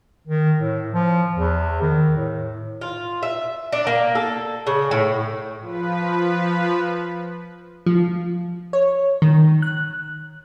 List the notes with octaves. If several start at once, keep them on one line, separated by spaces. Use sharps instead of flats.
D#3
A2
F3
E2
D#3
A2
F4
E5
D4
A#3
A4
C#3
A2
F3 B4
F3
C#5
D#3
F#6